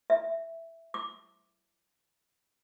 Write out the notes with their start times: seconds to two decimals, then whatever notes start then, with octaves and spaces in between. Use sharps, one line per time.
0.10 E5
0.94 D6